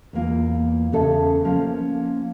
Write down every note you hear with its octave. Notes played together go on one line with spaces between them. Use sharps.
E2 A#3 F4
E2 C#3 A4 E5
F3 A#3 C#4